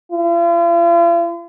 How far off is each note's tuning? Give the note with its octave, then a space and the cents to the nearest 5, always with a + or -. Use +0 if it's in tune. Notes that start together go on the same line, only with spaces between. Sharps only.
F4 -45